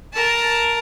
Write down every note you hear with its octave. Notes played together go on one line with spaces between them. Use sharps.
A#4 A5